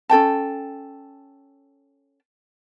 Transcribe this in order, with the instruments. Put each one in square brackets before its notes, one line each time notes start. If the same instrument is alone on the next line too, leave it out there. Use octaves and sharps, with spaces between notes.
[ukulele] C#4 A4 G5 A5